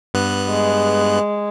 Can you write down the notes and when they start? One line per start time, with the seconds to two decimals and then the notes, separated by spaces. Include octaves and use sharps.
0.14 G2 B3 F#6
0.50 G#3